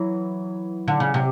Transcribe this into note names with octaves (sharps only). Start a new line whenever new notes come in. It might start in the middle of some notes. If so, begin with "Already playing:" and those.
Already playing: E3 F#3
D3
C#3
C3